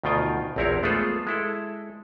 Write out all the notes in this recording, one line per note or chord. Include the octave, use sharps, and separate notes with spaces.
D2 B2 D#3 F4 G5 G#5
A#1 E2 C4 E4 A#4 C#5
G#3 A3 B3 F4 G#4 A4
G#3 E4 A4